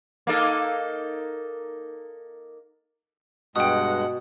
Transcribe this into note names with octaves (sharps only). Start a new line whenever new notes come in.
A#3 D#4 A4
G2 B2 G#3 F#5 G5 D#6